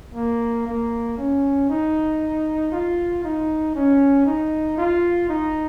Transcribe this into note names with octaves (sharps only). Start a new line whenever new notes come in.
A#3
A#3
C#4
D#4
F4
D#4
C#4
D#4
F4
D#4